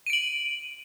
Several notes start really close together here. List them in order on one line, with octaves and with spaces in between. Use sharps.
D#7 D7 F#7